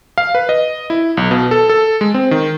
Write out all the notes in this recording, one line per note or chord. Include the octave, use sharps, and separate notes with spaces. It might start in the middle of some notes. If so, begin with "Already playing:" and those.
F5
B4
D#5
E4
B1
B2
A4
A4
G#3
C4
D#3